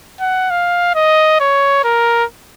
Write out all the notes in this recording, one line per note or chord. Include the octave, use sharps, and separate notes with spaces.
F#5
F5
D#5
C#5
A#4